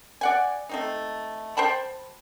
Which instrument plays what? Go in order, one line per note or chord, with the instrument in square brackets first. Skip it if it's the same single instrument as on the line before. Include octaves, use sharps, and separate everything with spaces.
[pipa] D5 F#5 G#5
A3 C4 D#4
C5 G5 A5 B5